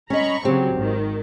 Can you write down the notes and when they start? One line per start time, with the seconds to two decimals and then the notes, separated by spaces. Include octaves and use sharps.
0.10 C#4 D#5 A#5 B5 C#6
0.45 C#3 F#3 C4 G4
0.74 G#1 D#3